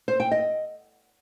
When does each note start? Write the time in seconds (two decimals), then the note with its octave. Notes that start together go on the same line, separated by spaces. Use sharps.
0.08 C5
0.20 G5
0.31 D#5